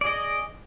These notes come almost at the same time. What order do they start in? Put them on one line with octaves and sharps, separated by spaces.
D5 G#4 D#5